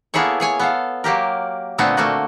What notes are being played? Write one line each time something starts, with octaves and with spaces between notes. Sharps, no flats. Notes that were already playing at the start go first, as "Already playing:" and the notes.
A#3 B3 E4 G#4 A4 C#5
G#4 C#5 G#5
B3 A4 F5
F#3 A#3 G4 A#4
A#2 D3 A3 B3 C4
A3 A#3 F#4